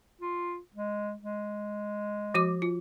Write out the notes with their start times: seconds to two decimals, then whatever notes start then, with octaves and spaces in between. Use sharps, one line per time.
0.22 F4
0.75 G#3
1.23 G#3
2.34 F3 F#4 D6
2.62 F4